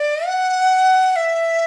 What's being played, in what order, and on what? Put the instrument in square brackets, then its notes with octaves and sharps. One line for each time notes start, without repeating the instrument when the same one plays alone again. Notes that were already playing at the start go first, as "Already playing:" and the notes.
Already playing: [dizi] D5
F#5
E5